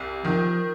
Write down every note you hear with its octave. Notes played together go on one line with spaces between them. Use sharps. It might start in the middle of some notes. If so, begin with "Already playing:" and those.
Already playing: C2
D#3 F3